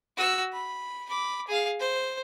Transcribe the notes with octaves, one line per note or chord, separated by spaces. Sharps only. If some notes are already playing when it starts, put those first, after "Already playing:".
F#4 E6
B5
B5 D6
G#4 F5
C5